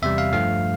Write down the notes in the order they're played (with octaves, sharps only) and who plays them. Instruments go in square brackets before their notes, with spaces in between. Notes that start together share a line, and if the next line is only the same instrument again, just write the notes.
[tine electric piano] E2 C3 G3 E5
F5
G2 F3 A3 F5